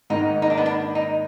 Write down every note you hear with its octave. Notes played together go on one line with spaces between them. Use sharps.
G#2 D#3 A#3 D#4
D#4
D4
B3
D4
D#4